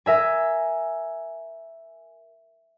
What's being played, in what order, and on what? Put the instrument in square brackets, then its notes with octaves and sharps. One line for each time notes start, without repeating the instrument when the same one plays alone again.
[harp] A#4 E5 G#5